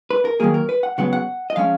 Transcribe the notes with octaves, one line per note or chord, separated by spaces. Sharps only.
B4
A#4
D#3 F#3 A#3 G#4
A#4
B4
F#5
C#3 F#3 B3 F#5
F#5
D#5
F3 G#3 C#4 F5